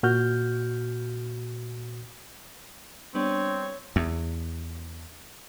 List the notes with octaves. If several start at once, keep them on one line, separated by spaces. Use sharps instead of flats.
A#2 F#4 F6 G6
G3 B3 C4 D4 C#5
E2